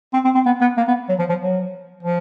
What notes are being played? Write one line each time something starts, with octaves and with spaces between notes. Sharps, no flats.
C4
C4
C4
B3
B3
A#3
B3
F#3
F3
F3
F#3
F3